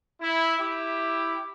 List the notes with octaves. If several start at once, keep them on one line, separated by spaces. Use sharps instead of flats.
E4
E4 G4